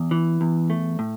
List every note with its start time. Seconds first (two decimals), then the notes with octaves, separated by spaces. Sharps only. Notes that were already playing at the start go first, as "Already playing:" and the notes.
Already playing: E2
0.11 E3
0.41 E2
0.70 A3
0.99 A2